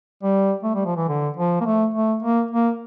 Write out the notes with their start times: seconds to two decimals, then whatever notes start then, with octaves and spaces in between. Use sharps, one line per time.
0.23 G3
0.63 A3
0.75 G3
0.86 F3
0.97 E3
1.09 D3
1.37 F3
1.61 A#3
1.66 A3
1.94 A3
2.23 A#3
2.51 A#3